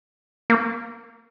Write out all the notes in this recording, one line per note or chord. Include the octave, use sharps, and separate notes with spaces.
A#3